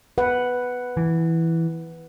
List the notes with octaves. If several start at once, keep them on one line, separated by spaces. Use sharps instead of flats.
B4 F#5
E3